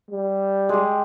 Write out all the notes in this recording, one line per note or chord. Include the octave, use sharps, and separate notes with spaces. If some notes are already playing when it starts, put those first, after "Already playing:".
G3
G#3 G4